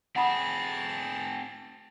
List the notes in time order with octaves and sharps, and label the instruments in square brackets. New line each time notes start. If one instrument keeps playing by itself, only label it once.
[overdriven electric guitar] C4 G#4 [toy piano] F#5 B5 D#6 [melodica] A5